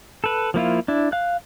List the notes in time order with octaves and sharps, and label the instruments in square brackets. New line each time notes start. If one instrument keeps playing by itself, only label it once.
[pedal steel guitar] A4 B4
F3 A#3 E4 F4
D4 E4
F5 F#6